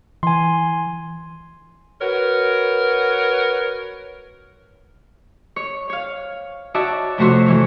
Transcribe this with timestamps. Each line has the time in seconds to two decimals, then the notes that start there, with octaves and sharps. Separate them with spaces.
0.23 E3 G#5 C6
2.01 F#4 A#4 B4 C#5
5.56 C#5
5.90 C#5 F5
6.74 D#4 F#4 C#5 D5 E5 A5
7.18 F2 C3 A3 F#4 C5 C#5
7.46 G#2 E3 C#5